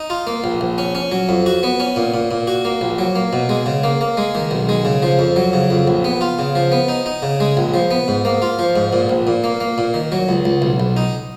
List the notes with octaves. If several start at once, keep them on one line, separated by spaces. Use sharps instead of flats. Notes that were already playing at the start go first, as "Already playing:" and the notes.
Already playing: D#4
F4
A#3
A#1
A#1
C#4
C#4
F#3
F2
F#4
B3
C#4
A#2
A#2
A#2
F#4
A#3
A#1
F#3
A#3
B2
G#3
C#3
A#3
A#3
G#3
D#3
B1
G#3
C#3
F3
F2
F#3
C#3
F2
A#1
B3
F4
C#3
F3
B3
D#4
D#4
C#3
G#3
A#1
F3
B3
G#2
A#3
F4
F3
G#2
A#2
A#1
A#2
A#3
A#3
A#2
D#3
F#3
C#2
C#2
B1
B1
D#4